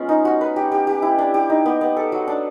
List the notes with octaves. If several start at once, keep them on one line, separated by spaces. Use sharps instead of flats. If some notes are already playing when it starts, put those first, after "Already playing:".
Already playing: G#3 B3 C#4 F4
D#4
F#4
B4
G4
G4
G4
E4
D4
G4
D#4
B3
B3
A4
F#3
D4